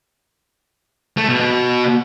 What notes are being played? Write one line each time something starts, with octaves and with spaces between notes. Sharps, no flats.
A3
B2
B2